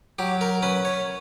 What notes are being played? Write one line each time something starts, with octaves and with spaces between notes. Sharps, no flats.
F#3 G4
A#4
C#4 B4
C#5